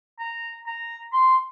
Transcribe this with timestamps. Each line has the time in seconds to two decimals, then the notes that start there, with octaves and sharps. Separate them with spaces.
0.19 A#5
0.67 A#5
1.13 C6